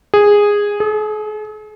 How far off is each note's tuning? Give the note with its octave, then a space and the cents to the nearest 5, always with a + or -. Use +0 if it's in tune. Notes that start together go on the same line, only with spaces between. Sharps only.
G#4 -10
G#4 +45